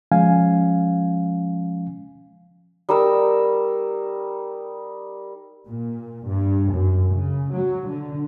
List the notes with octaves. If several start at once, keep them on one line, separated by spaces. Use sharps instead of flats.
F3 G#3 C#4 F5 G#5
G3 D#4 A#4 E6
A#2
G2
F#2
C#3
F#3
D3